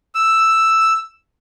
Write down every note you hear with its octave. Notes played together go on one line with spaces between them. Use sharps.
E6